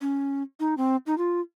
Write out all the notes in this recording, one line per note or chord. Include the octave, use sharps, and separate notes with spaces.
C#4
D#4
C4
D#4
F4